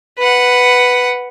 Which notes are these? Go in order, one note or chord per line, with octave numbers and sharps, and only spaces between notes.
B4 F#5